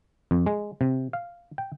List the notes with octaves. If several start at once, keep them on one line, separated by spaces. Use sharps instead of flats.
F2
G#3
C3
F5
G5